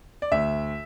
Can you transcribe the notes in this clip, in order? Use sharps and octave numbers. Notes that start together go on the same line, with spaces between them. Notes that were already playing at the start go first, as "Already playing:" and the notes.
D5
D2 E5